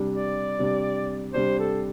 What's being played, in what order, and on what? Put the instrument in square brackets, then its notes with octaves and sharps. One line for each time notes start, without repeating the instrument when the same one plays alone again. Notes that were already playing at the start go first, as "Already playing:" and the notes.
Already playing: [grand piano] C3 G3 D4
[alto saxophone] D5
[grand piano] C3 G3 D4
[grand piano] C3 G3 D4 [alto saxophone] C5
[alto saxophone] A4